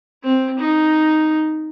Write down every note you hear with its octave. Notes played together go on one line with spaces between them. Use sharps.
C4
D#4